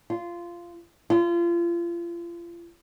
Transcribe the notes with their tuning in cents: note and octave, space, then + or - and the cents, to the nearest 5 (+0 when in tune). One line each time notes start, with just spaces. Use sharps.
F4 -15
F4 -35